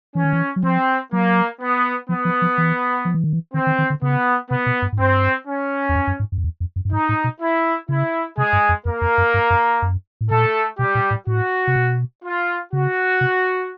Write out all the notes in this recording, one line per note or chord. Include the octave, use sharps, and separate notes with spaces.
E3 C#4
D#3
E3
F#3
F3 C4
F#3 A#3
B3
F3 B3
F3
F3
E3
F3
E3
D#3
E3
D#3 C4
D#3
D#3
D3
C#3 B3
C3 B3
B2
G2
G#2
G2 C4
C#4
E2
F2
F#2
G#2
F#2
F2
E2
F2
F#2
G2
G#2 D#4
A2
B2
E4
C#3 E4
C3 G#3 G#4
G2
F2
F2 A#3 A#4
F2
F#2
G2
F#2
F#2
A2
A#2 A3 A4
B2 G3 G4
A#2
A2
A2 F#4
C3
B2
F4
C#3 F#4
C3